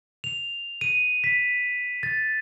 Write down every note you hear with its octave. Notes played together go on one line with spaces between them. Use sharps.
F7
D#7
B6
A6